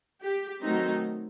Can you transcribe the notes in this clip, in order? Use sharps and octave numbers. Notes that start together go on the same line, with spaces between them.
G4
D#3 F#3 A3 C4 D#4